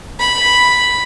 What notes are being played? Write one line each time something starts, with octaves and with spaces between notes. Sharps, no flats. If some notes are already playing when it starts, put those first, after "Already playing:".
B5